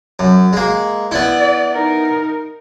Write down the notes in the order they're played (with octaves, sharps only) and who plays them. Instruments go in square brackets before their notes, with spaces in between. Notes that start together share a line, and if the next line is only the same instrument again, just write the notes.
[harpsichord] F#2
G#3 A#3
[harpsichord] B3 E4 [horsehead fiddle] D5
[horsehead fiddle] D#4 A#4